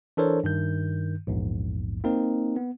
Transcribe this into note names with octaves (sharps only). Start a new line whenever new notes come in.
E3 D4 A4 A#4 C5 C#5
G2 D#3 G6
A#1 E2 G#2
A#3 C4 D#4 A#4
B3